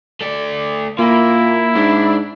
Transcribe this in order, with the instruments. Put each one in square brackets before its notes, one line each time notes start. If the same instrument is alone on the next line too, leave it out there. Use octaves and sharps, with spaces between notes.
[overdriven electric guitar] A3 D5
[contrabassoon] A#2 [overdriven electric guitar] A#3 [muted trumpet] E4
[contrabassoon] G#2 [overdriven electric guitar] D4